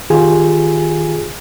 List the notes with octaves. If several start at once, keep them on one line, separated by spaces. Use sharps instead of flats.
D#3 F4 G4 G#4 G#5